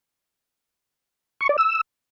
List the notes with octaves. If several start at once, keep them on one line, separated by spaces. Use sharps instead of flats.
C#6
D5
E6